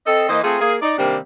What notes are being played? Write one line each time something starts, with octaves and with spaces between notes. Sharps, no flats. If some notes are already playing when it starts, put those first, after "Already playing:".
C4 A4 D#5
E3 A#3 C5 D#5
A3 C4 F4 G#4
A#3 G#4
D#4 D5
C3 D#3 G3 A#3 C4 D4